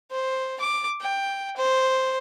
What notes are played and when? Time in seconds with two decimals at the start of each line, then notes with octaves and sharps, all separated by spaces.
0.11 C5
0.60 D6
1.01 G5
1.57 C5